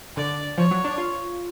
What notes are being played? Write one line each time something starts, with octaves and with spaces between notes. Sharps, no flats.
D3 D5
F3 C#5
F#3
D4
F4